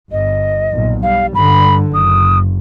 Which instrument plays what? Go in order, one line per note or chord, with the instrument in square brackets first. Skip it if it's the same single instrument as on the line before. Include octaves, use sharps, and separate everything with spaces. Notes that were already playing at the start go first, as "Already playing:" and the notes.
[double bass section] G1 [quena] D#5
[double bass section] B1 A#2
[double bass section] G3 [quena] F5
[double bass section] G2 D3 [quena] B5
[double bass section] F#1 [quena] D#6